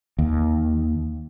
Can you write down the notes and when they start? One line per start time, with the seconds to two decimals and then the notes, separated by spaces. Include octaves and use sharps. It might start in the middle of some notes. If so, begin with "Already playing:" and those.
0.19 D#2